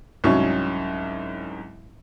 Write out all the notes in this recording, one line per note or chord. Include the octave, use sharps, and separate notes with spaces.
C2 G#2 F#3 C#4 C#6